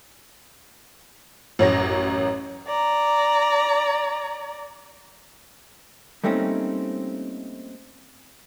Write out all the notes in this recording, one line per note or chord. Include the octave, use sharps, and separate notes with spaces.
A1 F#2 C#5 A#6
D5 A#5
G3 A3 A#3 C4 C#4 D#4